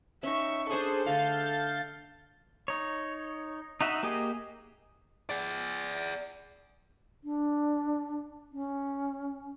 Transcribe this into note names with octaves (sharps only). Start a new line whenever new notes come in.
C#4 D#4 E5 C#6
D4 G#4 A4 C5 D5
D3 A3 F5 G6 A6
D#4 C#5
D#4 F#4 E5
A#3 G4 G#4 D#5
G#4 D5
D4
C#4